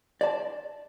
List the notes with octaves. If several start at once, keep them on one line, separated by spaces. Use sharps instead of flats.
D5 A5